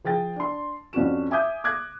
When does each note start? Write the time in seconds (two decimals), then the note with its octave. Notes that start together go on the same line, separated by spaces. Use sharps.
0.04 F3 G#4 G5 A6
0.36 D4 C6
0.93 F2 C#4 D4 F#4 E7
1.31 E5 G#5 D6 D#6 G6
1.64 D6 F#6 G#6 A#6